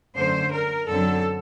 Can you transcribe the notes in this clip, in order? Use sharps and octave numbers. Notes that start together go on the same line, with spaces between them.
F#2 D3 A3 C5
A#4
F#2 D3 F#3 C4 A4